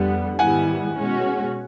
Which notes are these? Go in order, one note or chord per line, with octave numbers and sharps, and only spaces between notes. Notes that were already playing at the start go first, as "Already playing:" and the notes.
Already playing: F2 D3 G3 B3 F#5
G#2 D#3 G3 B3 E4 F#5 G#5
B2 G#3 C#4 F#4